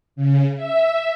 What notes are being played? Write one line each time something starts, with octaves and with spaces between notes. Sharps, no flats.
C#3
E5